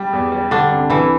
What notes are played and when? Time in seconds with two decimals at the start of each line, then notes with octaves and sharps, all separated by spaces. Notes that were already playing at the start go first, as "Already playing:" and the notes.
Already playing: G3
0.13 E2
0.32 G3
0.51 D3 G3 D4
0.71 C2
0.90 C2 E3 E4